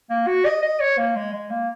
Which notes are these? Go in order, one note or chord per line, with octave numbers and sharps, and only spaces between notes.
A#3
F#4
D#5
D#5
C#5
A#3
G#3
G#3
A#3